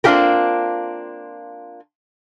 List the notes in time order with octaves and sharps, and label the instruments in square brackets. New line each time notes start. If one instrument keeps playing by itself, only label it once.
[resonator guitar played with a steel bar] A#3 C4 D4 F4 G4 A#4